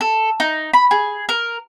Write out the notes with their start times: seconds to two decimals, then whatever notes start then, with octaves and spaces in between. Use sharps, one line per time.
0.01 A4
0.40 D#4
0.73 B5
0.91 G#4
1.29 A#4